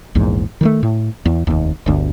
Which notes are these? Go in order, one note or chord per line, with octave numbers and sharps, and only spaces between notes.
A#1 E2 G#2
D#3 F3 A3
A2
E2
F1 D#2
G1 D2